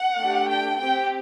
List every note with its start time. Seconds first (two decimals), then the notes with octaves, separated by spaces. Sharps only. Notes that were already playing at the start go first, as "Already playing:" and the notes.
Already playing: F#5
0.21 A3 D4 G4
0.50 G5
0.79 C4 G4 G5